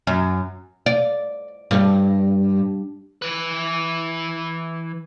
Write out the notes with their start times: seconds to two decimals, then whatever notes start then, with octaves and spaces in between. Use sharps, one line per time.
0.07 F#2
0.86 D5
1.71 G2
3.22 E3 B4